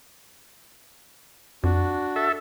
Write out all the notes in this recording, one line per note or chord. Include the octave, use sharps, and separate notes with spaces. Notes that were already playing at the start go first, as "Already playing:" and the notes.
F2 D4 F#4
A4 E5